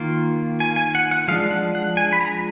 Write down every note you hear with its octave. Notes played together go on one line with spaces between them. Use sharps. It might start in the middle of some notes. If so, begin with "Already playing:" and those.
Already playing: D#3 A#3 F4
G#5
G#5
F#5
F#5
F3 G#3 D4 F5
F#5
F#5
G#5
B5
A#5